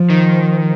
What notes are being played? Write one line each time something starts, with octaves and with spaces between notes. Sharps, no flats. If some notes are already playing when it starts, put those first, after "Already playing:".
Already playing: F3
D#3